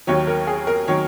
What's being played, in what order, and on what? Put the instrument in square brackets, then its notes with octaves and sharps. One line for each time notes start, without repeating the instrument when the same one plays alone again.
[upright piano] D#2 D#3 F#3 C#5
A#4
G#4
A#4
D#3 F#3 C#5